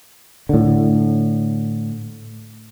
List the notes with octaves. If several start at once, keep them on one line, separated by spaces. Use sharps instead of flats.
A2 D3